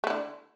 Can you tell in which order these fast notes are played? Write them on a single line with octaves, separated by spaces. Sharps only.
A3 E4 D3